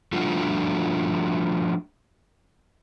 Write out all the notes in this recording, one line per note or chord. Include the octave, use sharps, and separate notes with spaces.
F3 G3 A3 D4 F4 F#4